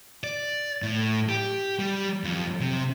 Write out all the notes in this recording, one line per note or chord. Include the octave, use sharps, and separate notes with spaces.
D5
A2
G4
G3
F2
C3